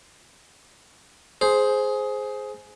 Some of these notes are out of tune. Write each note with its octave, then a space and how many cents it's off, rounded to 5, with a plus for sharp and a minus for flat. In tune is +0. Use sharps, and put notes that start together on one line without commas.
G#4 +15 C5 +0